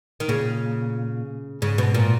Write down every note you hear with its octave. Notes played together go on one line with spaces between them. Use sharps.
D#3
A#2 C#3
G#2 C#3
B2
A#2